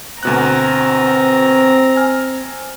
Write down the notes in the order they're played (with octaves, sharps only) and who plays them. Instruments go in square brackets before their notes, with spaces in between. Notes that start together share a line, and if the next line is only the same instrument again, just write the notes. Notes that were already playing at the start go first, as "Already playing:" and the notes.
[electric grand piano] D2 B2 F#6 [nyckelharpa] C4 A#5
[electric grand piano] G#5 F6